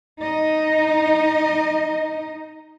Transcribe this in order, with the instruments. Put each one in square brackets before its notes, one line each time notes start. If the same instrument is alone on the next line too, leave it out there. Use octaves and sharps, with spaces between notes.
[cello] D#4 D#5